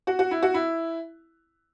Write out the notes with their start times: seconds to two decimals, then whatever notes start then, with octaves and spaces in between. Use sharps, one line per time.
0.07 F#4
0.19 F#4
0.31 E4
0.42 F#4
0.54 E4